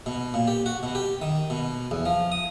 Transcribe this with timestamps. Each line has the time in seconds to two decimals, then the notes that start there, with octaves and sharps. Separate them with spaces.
0.06 B2
0.34 A#2
0.48 G4
0.66 F#4
0.83 B2
0.95 G4
1.22 D#3
1.50 B2
1.91 E2
2.05 F3
2.32 D#6